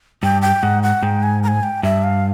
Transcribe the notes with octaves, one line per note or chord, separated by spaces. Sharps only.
G2 G5
G5
G#2 F#5
F#5
G#2 G5
G#5
A#5
G#5
G5
G2 E5
F5